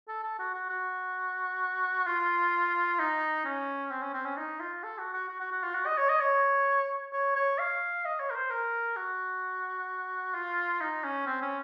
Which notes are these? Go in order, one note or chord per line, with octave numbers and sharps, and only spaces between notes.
A4
A4
F#4
F#4
F#4
F4
D#4
C#4
C4
C#4
C4
C#4
D#4
F4
A4
F#4
F#4
F#4
F#4
F#4
F4
F#4
D#5
C#5
D#5
C#5
C#5
C#5
F5
D#5
C#5
A#4
C5
A#4
F#4
F4
D#4
C#4
C4
C#4